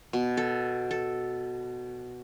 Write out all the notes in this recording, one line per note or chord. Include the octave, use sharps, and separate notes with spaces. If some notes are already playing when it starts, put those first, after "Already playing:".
B2
A4
A4